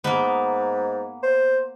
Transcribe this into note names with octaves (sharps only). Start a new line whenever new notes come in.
G#2 A#3 B3
C5